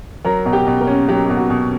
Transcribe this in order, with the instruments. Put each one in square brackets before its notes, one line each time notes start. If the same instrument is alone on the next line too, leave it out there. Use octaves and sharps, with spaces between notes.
[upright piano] F#3 [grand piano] A#4 A#5
[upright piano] B2
[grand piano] G4 G5
[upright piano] B2
[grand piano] A#3 A#4
[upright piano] C#4
[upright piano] F#3 [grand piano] G4
[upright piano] B2 [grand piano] G4
[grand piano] F#4
[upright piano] B2